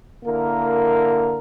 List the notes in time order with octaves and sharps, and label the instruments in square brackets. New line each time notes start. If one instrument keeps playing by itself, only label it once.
[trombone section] D3 A#3 E4 A#4